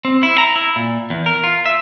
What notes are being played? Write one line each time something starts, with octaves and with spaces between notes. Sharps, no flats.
C4
E4
A#5
E4
A#2
E2
A#4
F4
E5